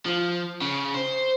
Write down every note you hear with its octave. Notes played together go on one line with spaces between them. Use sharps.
F3
C#3
C5